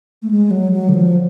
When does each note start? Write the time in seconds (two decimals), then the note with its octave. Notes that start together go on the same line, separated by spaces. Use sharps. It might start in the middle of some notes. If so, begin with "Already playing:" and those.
0.22 A3
0.31 G#3
0.51 F#3
0.72 F#3
0.89 D3
0.94 F3